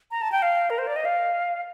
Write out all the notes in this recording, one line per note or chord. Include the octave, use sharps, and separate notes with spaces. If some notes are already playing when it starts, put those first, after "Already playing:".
A#5
A5
G5
F5
A#4
C5
D5
D#5
F5